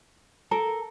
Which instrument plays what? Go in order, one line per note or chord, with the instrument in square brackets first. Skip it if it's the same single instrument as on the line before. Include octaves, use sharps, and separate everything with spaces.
[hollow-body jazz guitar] A4 [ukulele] A#4